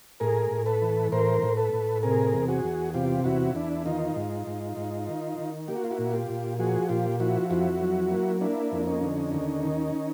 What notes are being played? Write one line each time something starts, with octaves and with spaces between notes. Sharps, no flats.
A2 G#4 A#4
A2
A4 B4
E3
A2 A#4 C5
A2
A4 B4
A2
C3 G#4 A#4
E2
F#4 G#4
E2
C3 F4 G4
E2 E4 F#4
E2 D4 E4
D#3 D#4 F4
G#2
G#2
G#2
D#3
D#3
A#3 G4
F#4
F4
E4 F#4
A#2
F4 G4
A#2
F3 F#4 G#4
A#2 F4 G4
F3 E4 F#4
F2 E4 F#4
F#3
A#3
A#3 D4 E4
F2
C#4 D#4
D3
D#2
D#3